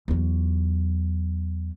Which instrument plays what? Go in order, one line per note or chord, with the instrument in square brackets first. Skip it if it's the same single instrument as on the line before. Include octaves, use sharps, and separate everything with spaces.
[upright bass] E2 F#3